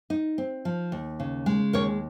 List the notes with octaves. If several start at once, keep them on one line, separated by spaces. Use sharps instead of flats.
D#4
C4
F3
D#2
C#3
G#3
D#2 A#4 C#5